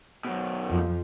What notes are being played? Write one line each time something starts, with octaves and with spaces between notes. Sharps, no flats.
F#2 B2
F2 F3